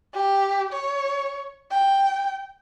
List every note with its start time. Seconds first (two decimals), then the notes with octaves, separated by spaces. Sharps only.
0.14 G4
0.73 C#5
1.72 G5